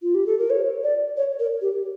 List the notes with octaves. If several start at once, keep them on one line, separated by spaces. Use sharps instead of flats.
F4
G4
A4
A#4
C#5
D5
C#5
A#4
G4